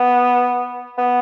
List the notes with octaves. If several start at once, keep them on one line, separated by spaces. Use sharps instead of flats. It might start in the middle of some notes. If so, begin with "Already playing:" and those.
Already playing: B3
B3